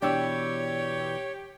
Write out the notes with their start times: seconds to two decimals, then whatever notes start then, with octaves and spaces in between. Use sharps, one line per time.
0.02 B2 E3 D4 G4 C#5 D5 G5 E6